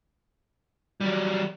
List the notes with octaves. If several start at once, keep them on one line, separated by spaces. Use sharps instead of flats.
F#3 G3